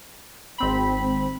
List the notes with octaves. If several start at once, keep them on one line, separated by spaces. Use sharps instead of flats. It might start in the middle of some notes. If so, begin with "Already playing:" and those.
G#1 C4 B5